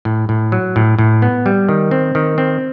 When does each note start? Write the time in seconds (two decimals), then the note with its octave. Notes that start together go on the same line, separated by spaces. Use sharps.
0.05 A2
0.29 A2
0.52 F#3
0.76 A2
0.99 A2
1.22 B3
1.46 G3
1.69 D#3
1.91 C4
2.15 D#3
2.38 C4